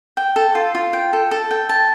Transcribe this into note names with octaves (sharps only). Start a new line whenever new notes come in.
G5
A4
F4
F4
G5
A4
A4
G5
A5